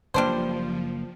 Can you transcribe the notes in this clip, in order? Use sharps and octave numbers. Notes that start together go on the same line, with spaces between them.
F#1 C#3 F3 G3 A#3 D4 C5